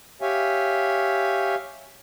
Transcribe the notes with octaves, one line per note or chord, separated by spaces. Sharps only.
G4 C#5 E5 F5 G#5